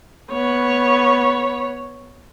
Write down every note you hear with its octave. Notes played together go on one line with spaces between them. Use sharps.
B3 C#5